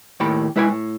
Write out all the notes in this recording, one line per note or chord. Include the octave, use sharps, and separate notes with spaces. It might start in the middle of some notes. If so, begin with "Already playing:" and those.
D#2 A2 D#3 G4 A5 B5
G#3 E4 B4 G5 G#5
A2